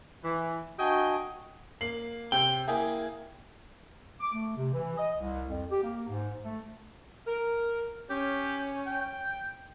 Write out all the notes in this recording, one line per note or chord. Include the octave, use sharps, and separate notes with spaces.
E3
D4 F#4 D#5 G5 G#5
A#3 C7 F#7
C3 G5
A#3 E4 G#4
D6
A3
C3
E3
D#5
C2
F2
G4
A#3
G#2
A3
A#4
C#4 G4
G5